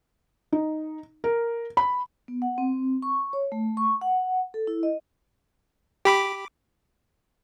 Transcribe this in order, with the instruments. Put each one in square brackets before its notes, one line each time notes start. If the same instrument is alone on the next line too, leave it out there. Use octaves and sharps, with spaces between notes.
[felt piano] D#4
A#4
B5
[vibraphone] B3
F#5
C4
C#6
C#5
A3
C#6
F#5
A4
E4
D#5
[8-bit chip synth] G4 B5 D6